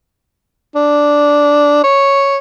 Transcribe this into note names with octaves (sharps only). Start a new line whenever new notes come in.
D4
C#5